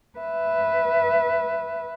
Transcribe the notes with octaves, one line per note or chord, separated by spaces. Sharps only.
B4 E5